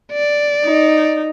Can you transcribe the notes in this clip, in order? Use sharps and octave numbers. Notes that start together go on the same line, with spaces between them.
D5
D#4